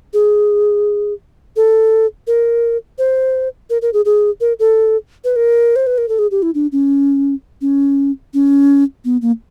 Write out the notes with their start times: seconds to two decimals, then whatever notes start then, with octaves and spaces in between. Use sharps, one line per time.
0.13 G#4
1.56 A4
2.27 A#4
2.98 C5
3.70 A#4
3.82 A#4
3.93 G#4
4.05 G#4
4.41 A#4
4.59 A4
5.24 B4
5.36 A#4
5.76 C5
5.87 B4
5.98 A#4
6.09 A4
6.19 G#4
6.31 G4
6.42 E4
6.55 D4
6.72 C#4
7.61 C#4
8.34 C#4
9.05 B3
9.22 A#3